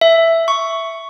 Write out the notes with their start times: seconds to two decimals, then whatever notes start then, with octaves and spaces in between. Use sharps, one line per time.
0.01 E5
0.48 C#6